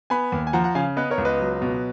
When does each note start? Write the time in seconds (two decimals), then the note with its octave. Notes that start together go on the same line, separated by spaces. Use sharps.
0.10 B3 G#5 B5
0.32 D#2
0.47 G#5
0.53 F3 F#5 A#5
0.64 F#5 A#5
0.75 C#3 F5 G#5
0.97 B3 B4 D#5
1.11 A#4 C#5
1.18 C#2
1.25 B4 D#5
1.40 F#3
1.62 B2